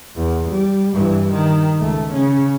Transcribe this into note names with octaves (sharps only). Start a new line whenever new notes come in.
E2
G3
G2 E3
D#3
C#2 A3
C#3 C#4